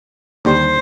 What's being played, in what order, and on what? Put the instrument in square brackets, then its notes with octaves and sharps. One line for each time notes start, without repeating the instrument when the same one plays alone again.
[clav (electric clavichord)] D#2 D3 G3 [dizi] C5